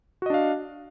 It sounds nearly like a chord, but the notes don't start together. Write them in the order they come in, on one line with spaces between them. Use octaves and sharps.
F#4 D#5 D4 F5